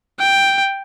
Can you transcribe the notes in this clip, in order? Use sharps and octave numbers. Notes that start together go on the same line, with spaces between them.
G5